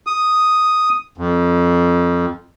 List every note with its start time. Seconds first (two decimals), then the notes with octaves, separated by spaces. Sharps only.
0.07 D#6
1.18 F2